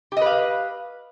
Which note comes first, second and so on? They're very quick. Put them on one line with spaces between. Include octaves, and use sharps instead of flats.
G4 D#5 B4 F5